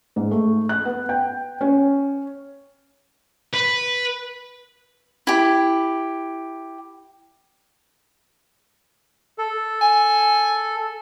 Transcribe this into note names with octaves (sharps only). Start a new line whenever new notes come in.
G#2
A3
F#6
B3
G5
C#4
B4
E4 G4
A4
G#5